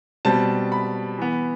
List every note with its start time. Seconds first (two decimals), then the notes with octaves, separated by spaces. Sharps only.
0.25 B2 G3 C4 A5
0.72 B5
1.18 E3 B3